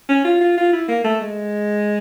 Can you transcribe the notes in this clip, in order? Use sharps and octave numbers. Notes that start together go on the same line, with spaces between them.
C#4
F4
F4
F4
E4
A#3
A3
G#3